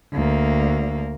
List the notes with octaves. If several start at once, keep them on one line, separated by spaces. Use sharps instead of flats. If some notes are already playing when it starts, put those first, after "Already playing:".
D2 A#3